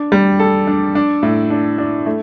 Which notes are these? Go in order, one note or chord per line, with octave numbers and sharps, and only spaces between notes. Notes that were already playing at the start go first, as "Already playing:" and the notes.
Already playing: D4
G3
A4
D4
D4
A2
D4
D4
A3